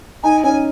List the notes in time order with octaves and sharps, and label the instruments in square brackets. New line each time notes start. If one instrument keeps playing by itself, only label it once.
[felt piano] D#4 [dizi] G#5
[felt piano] C#4 [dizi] G#5